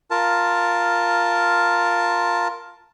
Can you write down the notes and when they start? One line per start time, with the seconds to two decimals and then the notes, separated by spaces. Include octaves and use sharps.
0.11 F4 A#4 A5